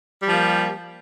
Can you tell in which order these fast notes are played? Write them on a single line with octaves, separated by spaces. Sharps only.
G3 G4 F3 A#3